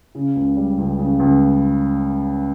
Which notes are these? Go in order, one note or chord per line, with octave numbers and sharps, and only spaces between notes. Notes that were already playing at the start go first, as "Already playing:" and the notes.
C#3
C#2
G3
C#2
C#3
C#2